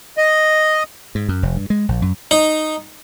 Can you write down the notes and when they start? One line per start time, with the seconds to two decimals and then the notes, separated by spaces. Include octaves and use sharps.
0.18 D#5
1.15 G#2
1.29 F#2
1.43 F1
1.56 G2
1.70 G#3
1.89 A#1
2.02 F#2
2.31 D#4